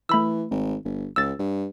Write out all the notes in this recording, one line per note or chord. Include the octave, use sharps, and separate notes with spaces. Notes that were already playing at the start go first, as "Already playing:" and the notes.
E3 A3 B5 E6
G#1
G1
C#2 E6 A6
G2